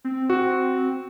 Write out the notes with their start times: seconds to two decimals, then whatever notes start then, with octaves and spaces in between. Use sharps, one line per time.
0.04 C4
0.30 F#4